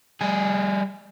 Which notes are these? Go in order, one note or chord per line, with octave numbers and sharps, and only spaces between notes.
G3 G#4